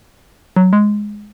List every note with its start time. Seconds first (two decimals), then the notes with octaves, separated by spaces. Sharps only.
0.56 F#3
0.73 G#3